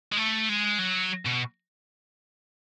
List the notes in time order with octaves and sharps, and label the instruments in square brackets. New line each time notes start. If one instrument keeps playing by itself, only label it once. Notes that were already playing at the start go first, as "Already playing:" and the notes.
[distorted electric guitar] G#3
A3
G#3
F#3
B2